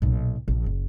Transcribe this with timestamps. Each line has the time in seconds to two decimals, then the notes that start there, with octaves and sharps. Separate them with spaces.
0.02 B1 A#2
0.48 A#1
0.66 F#1